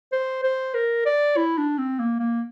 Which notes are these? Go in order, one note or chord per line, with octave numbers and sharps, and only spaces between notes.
C5
C5
A#4
D5
E4
D4
C4
A#3
A#3